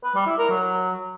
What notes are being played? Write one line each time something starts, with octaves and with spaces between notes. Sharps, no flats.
B4
G3
E4
A#4
F#3